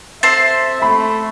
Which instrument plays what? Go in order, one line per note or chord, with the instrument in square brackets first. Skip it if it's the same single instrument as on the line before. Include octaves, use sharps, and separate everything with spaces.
[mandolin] C4 A4 C5 [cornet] E5 [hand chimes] A6 C7
[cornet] A3 [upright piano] B5